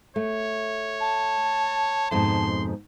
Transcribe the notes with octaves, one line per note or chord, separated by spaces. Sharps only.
A3 C#5
A5
F2 G#2 B2 C6